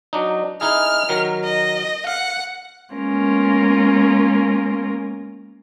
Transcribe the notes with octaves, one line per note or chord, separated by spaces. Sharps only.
F#3 D4 D#4
D#4 E4 G#4 F6
D#3 F#3 A#4
D#5
F5 F#5
G#3 A#3 B3 C#4 F4 A#4